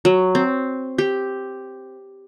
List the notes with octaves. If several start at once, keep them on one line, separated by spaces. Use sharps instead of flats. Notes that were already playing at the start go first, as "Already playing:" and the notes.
F#3
C4
G4